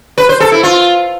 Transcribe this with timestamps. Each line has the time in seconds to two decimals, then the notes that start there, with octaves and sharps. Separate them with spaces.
0.18 B4
0.29 C5
0.40 A4
0.52 E4
0.63 F4